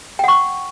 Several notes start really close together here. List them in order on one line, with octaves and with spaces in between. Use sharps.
G5 F#5 C#6